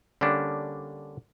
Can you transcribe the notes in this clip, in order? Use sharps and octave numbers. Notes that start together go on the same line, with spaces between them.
D3 G3 A#3 C#4 D4